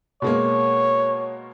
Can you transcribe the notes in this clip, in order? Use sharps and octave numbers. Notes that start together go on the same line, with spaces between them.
B2 G#3 A#3 C#5